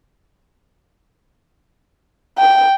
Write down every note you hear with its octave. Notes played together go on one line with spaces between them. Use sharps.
G5